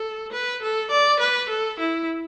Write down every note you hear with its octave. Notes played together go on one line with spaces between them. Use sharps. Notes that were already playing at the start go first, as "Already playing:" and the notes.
Already playing: A4
B4
A4
D5
B4
A4
E4